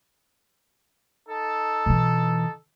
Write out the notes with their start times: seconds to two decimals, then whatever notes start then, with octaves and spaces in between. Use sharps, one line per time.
1.29 D#4 A4
1.86 B2 E3